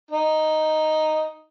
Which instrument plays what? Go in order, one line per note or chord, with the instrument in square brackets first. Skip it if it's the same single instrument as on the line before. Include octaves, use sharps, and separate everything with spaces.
[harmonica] D#4